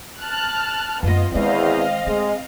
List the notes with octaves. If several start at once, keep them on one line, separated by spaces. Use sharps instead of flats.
A5 F6 F#6
F#2 A3 B3 F4 D#5
E2 D#3 G#3 C4 D#5 F5
G#3 A3